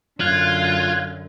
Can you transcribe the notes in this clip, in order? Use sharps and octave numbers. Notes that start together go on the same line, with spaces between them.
F#2 D3 F4 F5 F#6 G#6